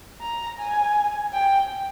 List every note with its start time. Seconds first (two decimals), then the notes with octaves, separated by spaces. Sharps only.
0.21 A#5
0.58 G#5
1.33 G5